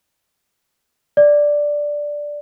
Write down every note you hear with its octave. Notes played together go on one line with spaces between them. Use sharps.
D5